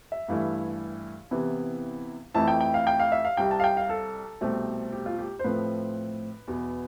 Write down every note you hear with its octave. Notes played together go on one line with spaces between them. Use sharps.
E5
G2 E3 A3 E4 F5
C3 E3 B3 E4
F2 E3 A3 E4 A5
G5
G5
F5
G5
F5
E5
F5
C2 C3 G3 G5
A5
F5
G5
F5
A4
C2 B2 A3 C4 G4
G4
F4
G4
C5
A2 F3 A3 C4 B4
E2 B2 B3